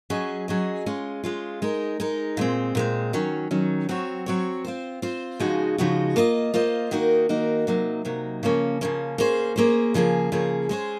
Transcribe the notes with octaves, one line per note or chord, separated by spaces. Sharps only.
F#3 C#4 G#4 D#5
F#3 C#4 G#4 D#5
G#3 C#4 F4
G#3 C#4 F4
G#3 D#4 A#4
G#3 D#4 A#4
A#2 G#3 C4
A#2 G#3 C4
D#3 F#3 C#4
D#3 F#3 C#4
F#3 C4 F#4 C#5
F#3 C4 F#4 C#5
C4 F4 C5
C4 F4 C5
C#3 F3 G#3 D#4 F#4
C#3 F3 G#3 D#4 F#4
A#3 F4 C5 D#5
A#3 F4 C5 D#5
D#3 A#3 D#4 F#4 A#4
D#3 A#3 D#4 F#4 A#4
C3 F#3 A#3 D#4
C3 F#3 A#3 D#4
C#3 F3 A#3 C#4
C#3 F3 A#3 C#4
A#3 C#4 G#4 C5
A#3 C#4 G#4 C5
C#3 F3 A#3 C#4 G#4
C#3 F3 A#3 C#4 G#4
G#3 C#4 G#4 C5